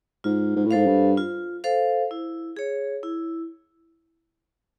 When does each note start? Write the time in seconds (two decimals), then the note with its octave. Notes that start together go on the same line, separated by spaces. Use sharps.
0.24 G#2 F4
0.56 G#2
0.65 A2
0.71 G#2 A4 C5 F5
0.86 G2
1.17 F4
1.64 A4 C5 F5
2.11 E4
2.57 G#4 C#5
3.03 E4